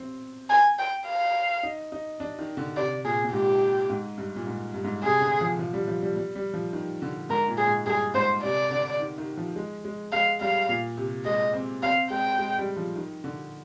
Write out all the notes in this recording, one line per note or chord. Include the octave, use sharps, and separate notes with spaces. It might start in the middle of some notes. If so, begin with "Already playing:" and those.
Already playing: C4
G#5
G5
F5
D#4
D#4
D4
D#3
D3
C3 D5
A#2 G#4
A#2
G#2 G4
G#2
G2
A#2
G#2
G2
G#2
C3 G#4
D3
F3
F3
G3
F3
G3
G3
G3
F3
D#3
D3
G#2 A#4
A#2
G#4
G#2
G2 G#4
G#2 C5
C3 D5
D3
D#3
D#3
F3
G#3
G#3
G#3 F5
G3 F5
A#2
C3
G#3 D#5
C4
C4 F5
G#3 G5
G#3
G3
F3
D#3
D3